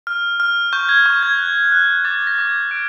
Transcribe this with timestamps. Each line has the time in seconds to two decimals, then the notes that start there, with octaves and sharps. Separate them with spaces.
0.07 F6
0.40 F6
0.73 C#6 G6
0.89 G#6
1.06 C#6 G6
1.23 G#6
1.39 F#6
1.72 F#6
2.04 D6 A6
2.27 A#6
2.38 D6
2.49 G#6
2.71 F6 D7